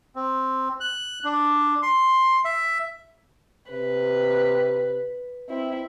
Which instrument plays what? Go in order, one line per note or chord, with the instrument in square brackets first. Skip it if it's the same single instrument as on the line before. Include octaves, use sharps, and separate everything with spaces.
[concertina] C4
F#6
D4
C6
E5
[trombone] C3 [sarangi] B4
[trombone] C4 [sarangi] E4